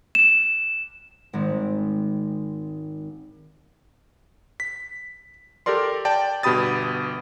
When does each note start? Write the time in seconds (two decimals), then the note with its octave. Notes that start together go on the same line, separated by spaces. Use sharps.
0.15 E7
1.33 G#1 G#3 C4
4.60 B6
5.66 G4 A4 A#4 D5 C6
6.05 D5 G5 A5
6.43 G1 B2 G4 B5 D#6 A6